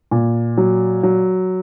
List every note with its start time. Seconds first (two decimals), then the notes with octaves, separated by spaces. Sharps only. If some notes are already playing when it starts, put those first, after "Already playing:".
0.11 A#2
0.57 F#3
1.03 F#3